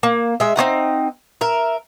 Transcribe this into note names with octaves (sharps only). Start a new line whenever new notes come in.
A#3
G#3 E5
C4 C#4 D#4 F#5
A#4 E5